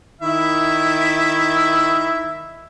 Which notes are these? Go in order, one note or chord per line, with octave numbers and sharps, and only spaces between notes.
D#3 E4 E5